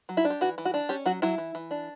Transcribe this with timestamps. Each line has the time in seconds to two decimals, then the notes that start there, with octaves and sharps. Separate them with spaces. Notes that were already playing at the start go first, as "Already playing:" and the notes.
0.09 F#3
0.17 E4
0.25 D4
0.30 G4
0.41 E3 F#4
0.58 E3
0.65 F#4
0.74 D4
0.89 C#4 G4
1.06 F#3 F#4
1.22 F#3 E4
1.38 E3
1.55 E3
1.71 D4